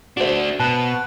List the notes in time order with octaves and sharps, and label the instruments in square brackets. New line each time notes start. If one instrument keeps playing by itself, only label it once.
[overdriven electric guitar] A3 D4 [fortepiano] F#4 C5
[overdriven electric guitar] B2 [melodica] B4 [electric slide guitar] A5